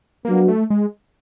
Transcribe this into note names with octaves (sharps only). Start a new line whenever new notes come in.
F#3 A#3 B3 D4 F#4
A3
G#3